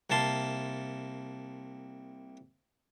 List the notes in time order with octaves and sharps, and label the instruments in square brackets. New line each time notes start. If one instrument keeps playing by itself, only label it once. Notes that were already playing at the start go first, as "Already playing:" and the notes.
[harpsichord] C2 C3 A#3 A5 C6